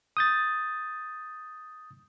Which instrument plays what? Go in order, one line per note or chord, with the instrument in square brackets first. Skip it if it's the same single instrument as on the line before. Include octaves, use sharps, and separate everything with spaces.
[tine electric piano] D#6 G6 A6